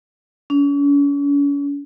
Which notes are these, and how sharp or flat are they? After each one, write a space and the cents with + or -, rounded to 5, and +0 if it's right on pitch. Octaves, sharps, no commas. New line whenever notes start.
C#4 +40